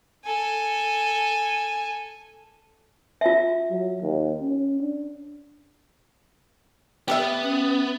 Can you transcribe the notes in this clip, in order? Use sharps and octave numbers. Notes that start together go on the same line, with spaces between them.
A4 G#5
F4 E5
F#3
D#2
C#4
D4
B3 G4 A4 E5
C#4